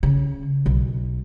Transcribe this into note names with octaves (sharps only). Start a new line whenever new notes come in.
C#3
B1